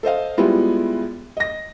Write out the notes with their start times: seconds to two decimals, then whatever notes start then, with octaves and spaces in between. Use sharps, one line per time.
0.03 A4 C5 D#5 F5
0.37 G3 G#3 B3 E4 F4
1.37 D#5 A#6